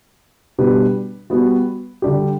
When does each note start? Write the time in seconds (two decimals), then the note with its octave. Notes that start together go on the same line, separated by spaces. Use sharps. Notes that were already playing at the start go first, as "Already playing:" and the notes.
0.58 B2 G3 D4 G4 B4
1.30 G3 B3 F#4
2.02 D3 G3 D4 G4